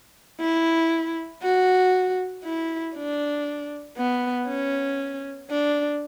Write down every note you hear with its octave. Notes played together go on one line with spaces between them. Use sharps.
E4
F#4
E4
D4
B3
C#4
D4